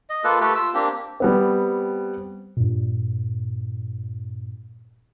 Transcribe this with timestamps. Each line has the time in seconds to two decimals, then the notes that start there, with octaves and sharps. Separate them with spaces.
0.10 D#5
0.24 A#3 F4 A4 B4
0.41 A3 G4 A4 B4
0.55 F4 E6
0.74 A#3 C4 D4 G4
1.20 G3 B3 C4
2.57 G2 A#2